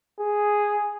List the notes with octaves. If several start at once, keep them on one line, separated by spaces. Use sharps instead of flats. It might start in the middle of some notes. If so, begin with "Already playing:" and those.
G#4